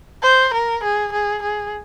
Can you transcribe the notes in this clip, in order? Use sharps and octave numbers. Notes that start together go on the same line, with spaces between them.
C5
A#4
G#4
G#4
G#4